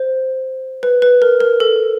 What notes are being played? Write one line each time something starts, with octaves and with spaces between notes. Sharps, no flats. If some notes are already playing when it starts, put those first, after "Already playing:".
Already playing: C5
B4
B4
A#4
A#4
A4